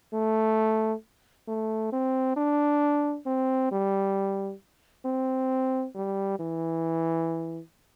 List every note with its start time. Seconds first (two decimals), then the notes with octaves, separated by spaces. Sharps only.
0.13 A3
1.48 A3
1.92 C4
2.37 D4
3.26 C4
3.72 G3
5.05 C4
5.95 G3
6.39 E3